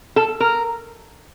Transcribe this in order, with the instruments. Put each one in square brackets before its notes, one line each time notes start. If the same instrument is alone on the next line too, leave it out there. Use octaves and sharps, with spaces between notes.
[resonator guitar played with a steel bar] A4
A#4